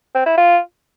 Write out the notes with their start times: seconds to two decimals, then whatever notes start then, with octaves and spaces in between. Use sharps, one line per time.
0.15 C4
0.26 E4
0.37 F4